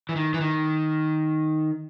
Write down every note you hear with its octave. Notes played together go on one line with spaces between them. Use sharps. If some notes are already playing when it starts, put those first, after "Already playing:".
E3
D#3
E3
D#3